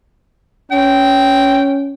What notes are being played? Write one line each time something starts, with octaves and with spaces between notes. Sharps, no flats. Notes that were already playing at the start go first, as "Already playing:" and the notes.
C#4 G5